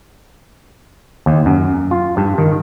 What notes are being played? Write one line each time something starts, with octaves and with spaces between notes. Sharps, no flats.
D#2
F#2
F4
G2
D#3